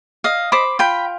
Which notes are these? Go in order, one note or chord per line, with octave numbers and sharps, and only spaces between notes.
D#5 F5
C5 B5 D6
F4 G5 B5